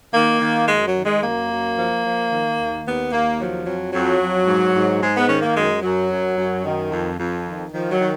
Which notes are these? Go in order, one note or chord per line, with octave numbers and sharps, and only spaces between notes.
D#3 A#3
D#3
F#2 G#3
F#3
D#3
G#3
F#2 A#3
F#2
F3
F3
D#3
D#2
D#2 B3
D#2 A#3
F3 F#3
F2 F#3
F2 F#3
F2
G#2
G#2
G#2 G#3
B3
D#3 C#4
A#3
F#2 G#3
F#2 F#3
F#2
F#2
D#3
F2
F2
D#3
D#3 F3
F#3
D#3